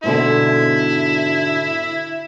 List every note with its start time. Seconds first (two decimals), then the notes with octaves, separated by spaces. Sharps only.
0.04 G#2 B2 D3 E4